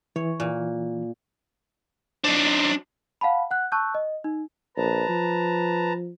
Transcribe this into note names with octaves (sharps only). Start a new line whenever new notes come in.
E3 C#5
A#2
F#3 D4 D#4 C5
F5 F#5 A5 B5
F#5 F#6
A5 C#6 E6 F#6 G6
D#5
D#4
A#1 B4 A5 A#5
F3